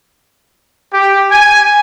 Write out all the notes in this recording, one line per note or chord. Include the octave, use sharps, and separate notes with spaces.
G4
G#5